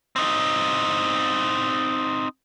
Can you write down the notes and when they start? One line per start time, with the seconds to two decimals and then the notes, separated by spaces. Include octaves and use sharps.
0.16 C4 D#4